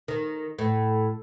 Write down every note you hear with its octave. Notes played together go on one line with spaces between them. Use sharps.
D#3
A2